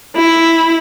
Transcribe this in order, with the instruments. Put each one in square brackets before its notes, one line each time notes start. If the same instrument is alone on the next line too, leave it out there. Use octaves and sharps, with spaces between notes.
[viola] E4